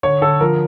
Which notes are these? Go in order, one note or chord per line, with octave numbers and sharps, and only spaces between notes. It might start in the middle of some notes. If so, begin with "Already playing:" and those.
D3 C#5
D3 A4
F3 A#4